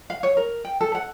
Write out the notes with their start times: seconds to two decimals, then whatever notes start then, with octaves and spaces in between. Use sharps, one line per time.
0.10 F5
0.23 C#5
0.37 A#4
0.65 G5
0.81 A4
0.95 F#5